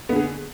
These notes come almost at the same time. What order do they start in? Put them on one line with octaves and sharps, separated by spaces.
B3 D3 G#4